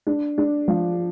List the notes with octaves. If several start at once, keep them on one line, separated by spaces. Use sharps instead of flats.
D4
D4
F3